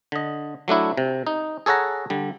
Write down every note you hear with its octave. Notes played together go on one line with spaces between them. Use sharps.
D3 D#5
F#3 A3 D4 E4
C3
D#4
G#4 A4 C#5 F#5 A#5
D3 G3